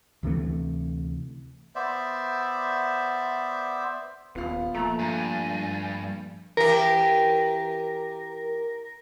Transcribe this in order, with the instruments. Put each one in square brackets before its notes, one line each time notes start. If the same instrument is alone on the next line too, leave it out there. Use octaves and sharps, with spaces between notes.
[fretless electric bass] D2 C3 E3 A3
[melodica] B3 C5 D5 E5
[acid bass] D#1 [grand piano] B3 F4 F5
[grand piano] A#2 F3 [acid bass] A3 [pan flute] A#5
[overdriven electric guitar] G2 [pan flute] G#5
[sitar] E3 G4 [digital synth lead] A#4